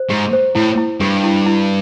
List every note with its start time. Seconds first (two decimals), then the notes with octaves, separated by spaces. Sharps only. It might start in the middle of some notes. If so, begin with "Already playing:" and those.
Already playing: C5
0.10 G#2 G4
0.33 C5
0.55 A2 E4
0.78 E4
1.00 G2 G4
1.24 E4
1.46 E4